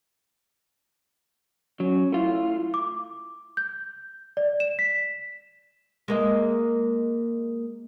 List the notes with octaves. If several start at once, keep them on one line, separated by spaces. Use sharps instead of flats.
F#3 C#4
A3 E4 F4
D6
G6
D5
E7
B6
G#3 A#3 D#5